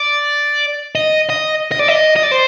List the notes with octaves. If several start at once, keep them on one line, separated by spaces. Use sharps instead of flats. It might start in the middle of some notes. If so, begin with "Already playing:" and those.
Already playing: D5
D#5
D#5
D#5
D5
D#5
D#5
D5
C5